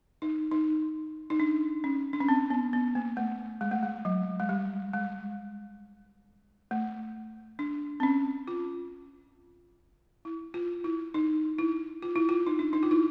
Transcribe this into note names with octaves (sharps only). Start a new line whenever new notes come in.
D#4
D#4
D#4
D4
C#4
D4
C#4
C4
B3
B3
A#3
A3
G#3
A3
G#3
F#3
G#3
G3
G#3
A3
D4
C4
C#4
F4
E4
F4
E4
D#4
E4
F4
E4
F4
D#4
D4
D#4
F4
E4